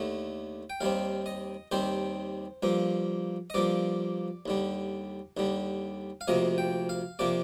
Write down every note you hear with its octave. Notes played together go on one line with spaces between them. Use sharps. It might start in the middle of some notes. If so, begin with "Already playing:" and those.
Already playing: D#2 D3 A3
G5
D#2 D#3 G3 C4 F5
D#5
D#2 D#3 G3 C4 C5
G2 F3 A#3
D#5
G2 F3 A#3 D5
D#2 D3 G3
D#2 D3 G3
F5
D2 C3 F3 A#3 D#5
G5
F5
C3 F3 A#3 D5